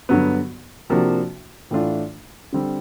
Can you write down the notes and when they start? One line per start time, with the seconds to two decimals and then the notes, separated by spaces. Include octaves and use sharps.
0.09 G2 D3 F#3 B3
0.90 C3 F3 A#3 D4 F#4
1.71 A2 E3 A3 D4 F4
2.53 D3 G3 C4